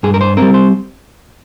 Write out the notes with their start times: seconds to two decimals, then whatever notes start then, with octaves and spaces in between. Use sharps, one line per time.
0.03 G2 G#4
0.14 A#4
0.21 C5
0.37 G3 C4 A#4
0.54 C5